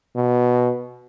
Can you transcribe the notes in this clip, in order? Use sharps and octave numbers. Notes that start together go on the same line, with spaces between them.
B2